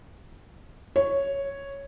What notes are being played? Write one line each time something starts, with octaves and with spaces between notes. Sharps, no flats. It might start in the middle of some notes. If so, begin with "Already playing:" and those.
C#5